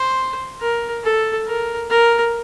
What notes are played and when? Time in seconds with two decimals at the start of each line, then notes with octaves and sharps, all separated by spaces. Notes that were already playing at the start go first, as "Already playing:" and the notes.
Already playing: C5
0.60 A#4
1.04 A4
1.46 A#4
1.90 A#4